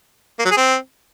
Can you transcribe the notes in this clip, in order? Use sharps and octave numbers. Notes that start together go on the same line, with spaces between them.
A#3
F#3
G#4
C4